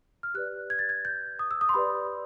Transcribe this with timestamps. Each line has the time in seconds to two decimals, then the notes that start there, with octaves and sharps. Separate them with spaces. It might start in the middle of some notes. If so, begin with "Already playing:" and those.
0.23 F6
0.34 G4 B4 D5 F#6
0.70 G#6
0.79 A6
0.89 G#6
1.05 G6
1.39 D#6
1.51 E6
1.61 D#6
1.69 C6
1.74 G4 B4 D5 B5